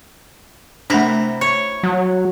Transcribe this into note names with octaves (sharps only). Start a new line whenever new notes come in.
C3 A3 D4 E4 A#5
C#5
F#3